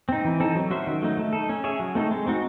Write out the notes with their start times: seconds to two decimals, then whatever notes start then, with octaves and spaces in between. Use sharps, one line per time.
0.09 C4 D#4
0.25 E3
0.40 C4 D#4 A4
0.55 F#3
0.71 C#4 F#4 C5 E5
0.87 D#3
1.02 F#3 A3 D#4
1.17 A3
1.33 D#4 A4
1.49 C#4
1.64 G#4 C#5 E5
1.80 F#3
1.95 A3 C4 D#4 A4
2.11 G#3
2.26 C4 D#4 F#4